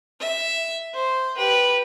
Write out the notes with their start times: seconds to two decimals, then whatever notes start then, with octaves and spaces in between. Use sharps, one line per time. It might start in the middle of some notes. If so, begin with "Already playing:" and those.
0.20 E5
0.94 C5
1.36 G4 B4